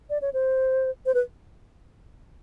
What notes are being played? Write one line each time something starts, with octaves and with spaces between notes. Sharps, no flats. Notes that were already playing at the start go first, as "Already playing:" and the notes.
D5
C#5
C5
C5
B4